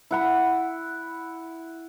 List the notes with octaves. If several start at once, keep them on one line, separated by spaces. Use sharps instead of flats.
E4 F#5 B5